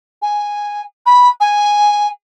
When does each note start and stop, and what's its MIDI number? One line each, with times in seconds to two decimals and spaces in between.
0.22 0.81 80
1.06 1.28 83
1.40 2.07 80